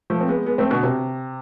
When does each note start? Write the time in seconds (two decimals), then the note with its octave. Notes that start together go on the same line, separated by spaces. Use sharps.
0.10 F3 A3
0.21 C4
0.29 G#3 B3
0.46 G#3 B3
0.58 A3 C4
0.71 B2 D3
0.83 C3